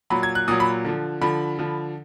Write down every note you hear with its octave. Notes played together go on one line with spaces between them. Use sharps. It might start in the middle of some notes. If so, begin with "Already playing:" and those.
A#2 F#3 B5
G#6
F#6
A#2 F#3 D#6
B5
D3 F3
D3 F3 B5
D3 F3